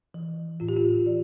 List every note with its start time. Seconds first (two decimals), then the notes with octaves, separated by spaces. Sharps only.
0.14 E3
0.60 A2 F4
0.69 G4
0.77 F4
1.06 E3 D5